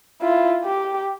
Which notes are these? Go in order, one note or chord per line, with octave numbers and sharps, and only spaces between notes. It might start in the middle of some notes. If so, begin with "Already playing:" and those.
E4 F4
G4